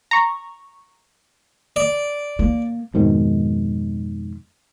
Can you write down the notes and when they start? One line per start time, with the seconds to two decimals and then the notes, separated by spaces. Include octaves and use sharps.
0.11 A#5 C#6
1.76 D5
2.39 A#3
2.94 F2 G#2 B2 D#3